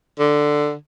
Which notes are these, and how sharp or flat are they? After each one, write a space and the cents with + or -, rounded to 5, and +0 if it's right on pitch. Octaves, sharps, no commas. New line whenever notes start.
D3 +5